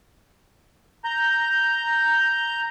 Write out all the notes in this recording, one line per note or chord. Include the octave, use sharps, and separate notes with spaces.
A#5 G6